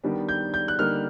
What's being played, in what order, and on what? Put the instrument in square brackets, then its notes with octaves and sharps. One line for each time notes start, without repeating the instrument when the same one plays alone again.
[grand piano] D#3 G3 B3 D4
G6
G6
F#6
D3 G3 A#3 D#4 F6